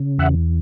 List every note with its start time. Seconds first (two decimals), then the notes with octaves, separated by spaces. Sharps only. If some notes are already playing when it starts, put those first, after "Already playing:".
Already playing: C#3
0.18 E2 E5 F#5